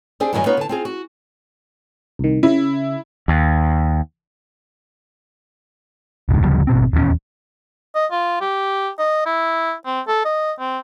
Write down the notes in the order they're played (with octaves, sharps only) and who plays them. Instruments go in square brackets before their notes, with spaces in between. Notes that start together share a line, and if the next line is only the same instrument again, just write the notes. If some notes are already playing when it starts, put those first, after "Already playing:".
[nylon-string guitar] C4 D4 G4 G#4
G2 D#3 F#3 G#4 D#5 G#5
B3 D#4 F4 B4 C#5
D3 A5
C4 F4 G#4
F#4
[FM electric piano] C2 D#3
[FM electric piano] C#3 [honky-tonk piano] E4
[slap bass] D#2
[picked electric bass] E1 C#2 G#2
D2 C#3 F3 G3
G#1 B2 C4
D#1 E2 F3 C#4
[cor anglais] D#5
F4
G4
D#5
E4
C4
A4
D#5
C4